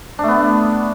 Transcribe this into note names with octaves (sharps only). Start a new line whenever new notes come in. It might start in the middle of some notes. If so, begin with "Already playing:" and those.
A3 B3 D4